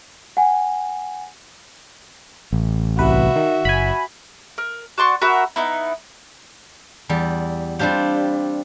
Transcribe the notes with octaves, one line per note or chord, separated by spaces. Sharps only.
F#5 G#5
A1
C2 F#4 B4 E5
D#3
F#1 G#5 B5
A#4
F#4 D5 C6 C#6
F#4 A#4 E5 B5
B3 D#4 E4
E2 G3
G3 C4 D4 F4 G4